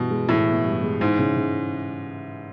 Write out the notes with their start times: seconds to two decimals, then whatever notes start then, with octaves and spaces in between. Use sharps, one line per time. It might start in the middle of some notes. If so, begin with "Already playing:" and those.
Already playing: G2 B2 E3 B3
0.11 G#3
0.29 A2 E3
0.48 B3
0.65 G2
0.83 G#3
1.01 G#2 E3
1.19 C#3
1.36 C#3